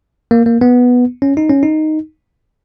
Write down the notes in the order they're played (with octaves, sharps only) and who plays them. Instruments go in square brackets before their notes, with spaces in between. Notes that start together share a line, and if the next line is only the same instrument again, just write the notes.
[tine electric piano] A#3
A#3
B3
C#4
D#4
C#4
D#4